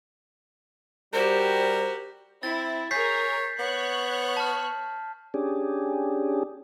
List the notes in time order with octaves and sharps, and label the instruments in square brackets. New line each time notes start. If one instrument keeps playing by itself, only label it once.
[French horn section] G3 [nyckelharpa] F#4 G4 [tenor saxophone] A#4 [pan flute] C5
[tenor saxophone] C4 [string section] E4 [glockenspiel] A6
[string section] G#4 A#4 [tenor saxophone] C#5 [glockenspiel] G6 B6 C7
[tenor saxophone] B3 [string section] C#5 C#6 F#6
[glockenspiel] A5 F6
[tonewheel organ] C#4 D4 G4 G#4